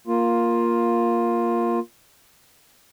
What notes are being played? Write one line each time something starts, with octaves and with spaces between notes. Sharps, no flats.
A#3 F4